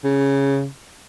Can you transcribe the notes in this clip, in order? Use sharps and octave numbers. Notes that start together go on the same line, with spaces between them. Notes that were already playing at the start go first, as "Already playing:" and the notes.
C#3